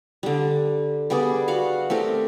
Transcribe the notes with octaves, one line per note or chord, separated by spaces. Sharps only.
D3 G3
G3 B3 G#4 D5
F#4 F5 F#5
A3 C4 G4 A#4